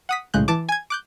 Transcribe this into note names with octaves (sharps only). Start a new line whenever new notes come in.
F#5 D#6 B6
B1 A2 C#3 G#3 F#6 G6
E3 A5 D6
G#5 G#6
D6 F#6 G6